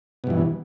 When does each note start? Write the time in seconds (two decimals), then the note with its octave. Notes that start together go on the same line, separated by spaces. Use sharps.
0.24 B2
0.27 G2
0.30 E3